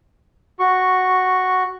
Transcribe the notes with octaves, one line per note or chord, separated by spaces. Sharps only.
F#4 C#6